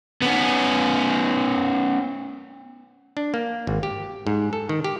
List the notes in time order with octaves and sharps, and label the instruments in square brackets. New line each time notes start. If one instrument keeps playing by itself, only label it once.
[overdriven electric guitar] B3 C#4
[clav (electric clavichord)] D4
A#3
G#1
G4
G#2
A4
D#3
G4